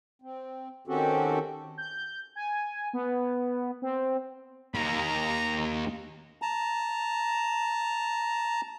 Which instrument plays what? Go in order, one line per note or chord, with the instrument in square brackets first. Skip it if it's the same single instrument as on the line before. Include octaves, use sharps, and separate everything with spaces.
[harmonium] C4
D#3 C4 C#4 F#4 G4 A4
[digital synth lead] G6
G#5
B3
C4
[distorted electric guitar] D#2 [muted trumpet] A#5
[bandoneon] A5 A#5